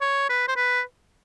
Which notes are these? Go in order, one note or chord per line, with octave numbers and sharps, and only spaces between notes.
C#5
B4
C5
B4